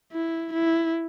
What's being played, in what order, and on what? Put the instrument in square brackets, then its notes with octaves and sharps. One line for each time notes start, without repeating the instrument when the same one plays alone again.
[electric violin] E4
E4